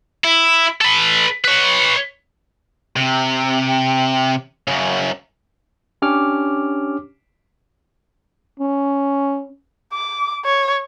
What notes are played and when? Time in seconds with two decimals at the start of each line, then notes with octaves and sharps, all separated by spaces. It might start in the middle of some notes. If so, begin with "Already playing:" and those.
0.24 E4
0.81 A4 B4
1.44 B4 C#5
2.96 C3
4.68 F#2 C#3
6.02 C#4 D4 G4 C#5 D6 F6
8.60 C#4
9.93 D6
10.45 C#5